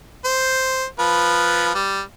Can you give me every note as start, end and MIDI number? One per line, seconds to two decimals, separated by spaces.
0.25 0.85 72
0.99 1.72 53
0.99 1.72 71
1.75 2.01 55